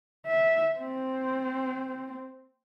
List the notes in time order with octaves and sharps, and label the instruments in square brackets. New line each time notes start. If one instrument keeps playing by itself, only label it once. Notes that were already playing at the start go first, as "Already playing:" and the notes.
[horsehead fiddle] E5
C4